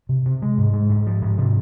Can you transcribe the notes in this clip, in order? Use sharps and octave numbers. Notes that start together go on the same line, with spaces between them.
C3
C3
G#3
G#2
G#3
G#2
F3
G#2
C3